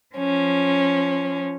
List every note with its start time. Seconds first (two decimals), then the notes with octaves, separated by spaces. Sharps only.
0.13 F3 C#4